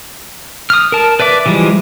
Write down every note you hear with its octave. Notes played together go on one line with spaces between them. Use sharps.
D#6 F6
A#4 A5
B4 D5 E5 D6
E3 F3 G3 G#3